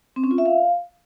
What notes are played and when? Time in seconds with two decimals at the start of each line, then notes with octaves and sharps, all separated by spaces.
0.16 C4
0.24 C#4
0.31 F4
0.38 E5
0.45 F5